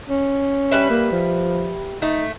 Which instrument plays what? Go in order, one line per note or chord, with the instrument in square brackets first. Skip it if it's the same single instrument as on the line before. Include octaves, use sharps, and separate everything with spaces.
[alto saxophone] C#4
[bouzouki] G3 B4 E5
[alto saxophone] A#3
F3
[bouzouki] A3 [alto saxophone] D#4